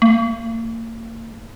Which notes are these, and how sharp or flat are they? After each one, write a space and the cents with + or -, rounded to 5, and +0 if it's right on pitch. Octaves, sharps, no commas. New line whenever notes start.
A#3 -40